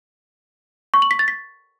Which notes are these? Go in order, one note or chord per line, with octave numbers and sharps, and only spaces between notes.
C#6
F#7
B6
A6
B6